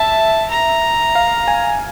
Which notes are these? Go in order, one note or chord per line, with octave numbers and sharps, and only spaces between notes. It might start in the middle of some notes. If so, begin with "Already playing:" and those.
Already playing: E5 A5
A#5
F5
G#5